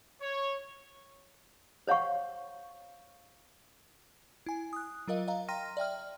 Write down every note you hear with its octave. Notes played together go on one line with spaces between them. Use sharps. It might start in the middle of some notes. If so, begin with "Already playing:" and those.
C#5
C5 C#5 F5 F#5 C#6
E4 G#5
D#6 F#6
F#3 F4 A#4 D#5 F5
D#5 F5 A#5
G5 A#5 C6 F6 A#6 D#7
D5 E5 G5 F6